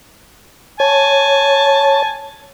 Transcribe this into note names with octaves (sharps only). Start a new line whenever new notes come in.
C#5 G#5 A5